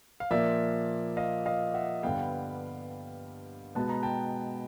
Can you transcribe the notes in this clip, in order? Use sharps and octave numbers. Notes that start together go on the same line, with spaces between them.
F5
A#2 F3 A#3 D5 E5
D#5 F5
D#5 F5
E5 F#5
G2 D3 G3 B3 F5 G5
B2 G#3 B3 A5
A#5
G5 A5